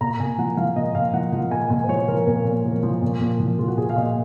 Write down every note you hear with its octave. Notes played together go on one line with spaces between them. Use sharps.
A#2 A#5
A#2 G#5
F3 F#5
F3 F5
A#2 D#5
A#2 F5
F3 F#5
F3 F#5
A#2 G#5
A#2 G#5
C5
F3 C#5
F3 A#4
A#2 A#4
A#2
F3
F3
A#2
A#2
F3
F3 F4
F#4
A#2 G#4
F5
A#2 D#5